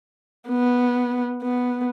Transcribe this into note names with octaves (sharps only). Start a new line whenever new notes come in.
B3
B3